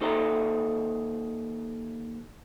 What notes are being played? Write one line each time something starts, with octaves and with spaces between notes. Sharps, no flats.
D#2 D#4 A4 C5 E5 A#5